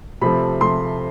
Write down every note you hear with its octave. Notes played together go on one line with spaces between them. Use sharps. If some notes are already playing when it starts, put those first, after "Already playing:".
C3 F3 A3 B5
C3 F3 A3 C6